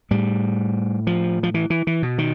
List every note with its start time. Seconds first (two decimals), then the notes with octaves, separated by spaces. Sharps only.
0.11 A2 G3
1.07 F3
1.43 F3
1.54 E3
1.70 E3
1.87 E3
2.03 B2
2.18 D#3